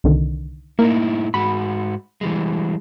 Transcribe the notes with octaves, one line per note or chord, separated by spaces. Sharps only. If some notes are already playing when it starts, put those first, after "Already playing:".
C2 D3 D#3
A2 A#3 D#4 E4
G#2 F#4 B5
E3 G3 G#3